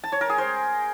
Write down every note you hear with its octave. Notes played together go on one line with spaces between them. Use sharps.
A5
C#5
A#4
G#4
C5